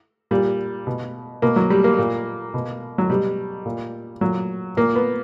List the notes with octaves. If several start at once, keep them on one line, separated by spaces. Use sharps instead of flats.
A#2 G3
B2
B2 A#3
F#3
G3
A#3
A#2
B2
F#3
B2 G3
A#2
A#2 F#3
A#2 A#3
B3